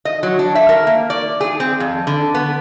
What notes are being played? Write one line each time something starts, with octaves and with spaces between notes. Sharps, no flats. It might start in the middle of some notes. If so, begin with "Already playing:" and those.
D#5
F#3
D4
E5
A#4
A#3
D5
G#4
C4
F2
D3
B3